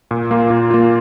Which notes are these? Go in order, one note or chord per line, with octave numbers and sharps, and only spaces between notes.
A#2
A#3 F4
A#2
A#3 F4